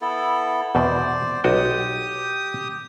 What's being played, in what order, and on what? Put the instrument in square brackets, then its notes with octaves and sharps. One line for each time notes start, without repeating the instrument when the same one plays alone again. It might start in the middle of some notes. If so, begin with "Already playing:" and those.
[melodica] B3 E4 A4
[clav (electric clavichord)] E2 B2 [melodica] C5 D5
[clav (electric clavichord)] B1 F#4 G5 [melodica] G4 D#6